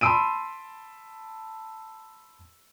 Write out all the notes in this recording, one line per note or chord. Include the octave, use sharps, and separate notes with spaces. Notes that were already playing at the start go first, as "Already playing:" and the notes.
A5 B5 C6 E6 D7 D#7